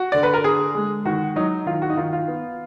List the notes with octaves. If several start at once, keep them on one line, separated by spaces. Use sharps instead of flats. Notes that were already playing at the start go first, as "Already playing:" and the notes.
Already playing: F#4
D3 D5
B4
A#4
D3 G#4
G#3
D#3 F#4
F#3 D#4
D#3 F4
F#4
D#4
D#3 F4
F4
B3